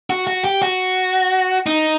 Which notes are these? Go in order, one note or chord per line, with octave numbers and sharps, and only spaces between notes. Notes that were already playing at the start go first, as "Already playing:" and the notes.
F#4
F#4
G4
F#4
D#4